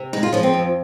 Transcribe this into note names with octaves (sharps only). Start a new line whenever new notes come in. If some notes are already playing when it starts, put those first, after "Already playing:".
Already playing: C3
G#3 D#4
F4
F3 C#4
C4
F2